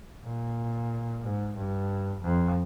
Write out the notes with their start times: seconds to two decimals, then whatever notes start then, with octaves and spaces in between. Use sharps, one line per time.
0.25 A#2
1.22 G#2
1.56 G2
2.21 F2